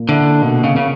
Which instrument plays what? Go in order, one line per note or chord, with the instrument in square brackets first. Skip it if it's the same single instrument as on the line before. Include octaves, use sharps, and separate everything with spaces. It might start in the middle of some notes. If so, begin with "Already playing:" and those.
Already playing: [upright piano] A#2 A#3
[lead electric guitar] D3 [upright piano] E4
[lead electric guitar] B2 [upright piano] A#3
[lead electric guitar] C#3
[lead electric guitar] C#3 [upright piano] A#3